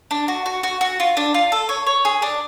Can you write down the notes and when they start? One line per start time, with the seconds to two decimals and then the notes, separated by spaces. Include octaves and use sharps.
0.11 D4
0.28 F#4
0.46 F#4
0.63 F#4
0.81 F#4
1.00 F4
1.17 D4
1.34 F4
1.52 A4
1.69 C#5
1.87 C#5
2.05 G#4
2.22 D4